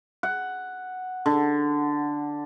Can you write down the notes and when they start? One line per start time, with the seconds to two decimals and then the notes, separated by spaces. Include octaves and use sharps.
0.23 F#5
1.26 D3